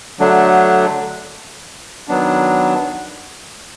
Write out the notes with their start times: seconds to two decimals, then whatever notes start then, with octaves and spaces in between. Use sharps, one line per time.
0.19 D3 F#3 A3 D4
2.08 D#3 F#3 B3 D4